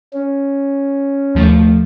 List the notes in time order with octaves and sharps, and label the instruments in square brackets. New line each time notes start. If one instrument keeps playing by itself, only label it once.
[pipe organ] C#4
[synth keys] D#2 F3 A3